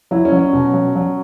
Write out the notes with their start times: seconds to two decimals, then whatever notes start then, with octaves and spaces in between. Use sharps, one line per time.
0.11 F#3 E4
0.25 C#4
0.32 F#3
0.39 C#4
0.53 B2
0.73 F#3
0.96 F#3